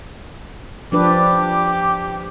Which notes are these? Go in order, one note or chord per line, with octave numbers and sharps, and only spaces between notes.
F3 D4 G4 B4 D6